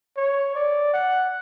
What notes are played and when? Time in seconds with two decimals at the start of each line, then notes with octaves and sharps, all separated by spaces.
0.17 C#5
0.55 D5
0.93 F#5